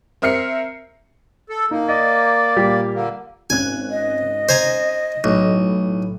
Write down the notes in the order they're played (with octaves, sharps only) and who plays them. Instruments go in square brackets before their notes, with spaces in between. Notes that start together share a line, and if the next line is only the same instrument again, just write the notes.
[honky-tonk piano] C4 A#4 E5 F6 C7 C#7
[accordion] A4
[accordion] A#3 [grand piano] D#4
[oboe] D5 [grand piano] D#5
[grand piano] A#2 G3 G4
[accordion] D3 A#3
[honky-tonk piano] G#1 C#4 F#6 [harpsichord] G#5
[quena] D#5
[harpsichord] C5 G#5 A#5
[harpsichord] B1 [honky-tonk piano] A2